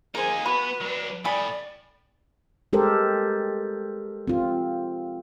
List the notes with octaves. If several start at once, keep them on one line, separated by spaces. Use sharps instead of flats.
A#3 D#4 G#4 A#4 C5 G#5
B3 F#4 B4 B5
F#3 D4
A2 D5 G5 G#5 B5 D#6
G#3 G4 A4 A#4 C5
C4 F4